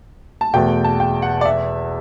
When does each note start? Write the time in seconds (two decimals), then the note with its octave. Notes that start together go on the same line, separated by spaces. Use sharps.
0.41 A5
0.53 E2 B2 A3 G5
0.84 A5
1.00 G5
1.22 F#5
1.41 D5
1.46 E5